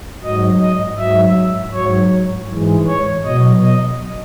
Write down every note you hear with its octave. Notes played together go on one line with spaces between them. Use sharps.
G#2 F#3 D#5
D#5
G#2 F#3 E5
G#2 F#3 C#5
G#2 E3 G#3
C#5
B2 F#3 D#5
D#5